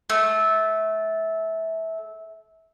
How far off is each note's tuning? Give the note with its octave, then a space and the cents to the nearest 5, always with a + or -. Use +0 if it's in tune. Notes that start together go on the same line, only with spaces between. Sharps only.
A3 -25